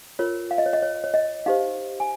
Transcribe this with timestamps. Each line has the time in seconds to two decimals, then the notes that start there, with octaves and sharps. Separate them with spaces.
0.19 F4 A#4 C#5
0.51 F5
0.58 D#5
0.66 C#5
0.73 D#5
0.82 C#5
1.04 C#5
1.14 D#5
1.46 D#4 G4 C5 F5
2.00 G#5